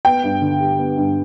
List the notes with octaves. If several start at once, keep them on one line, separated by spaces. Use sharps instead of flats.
B3 G5
G2
D3
G3
B3
G2